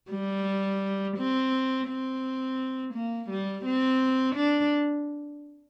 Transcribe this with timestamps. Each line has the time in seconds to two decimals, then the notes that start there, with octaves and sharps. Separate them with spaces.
0.11 G3
1.17 C4
1.88 C4
2.94 A#3
3.30 G3
3.65 C4
4.36 D4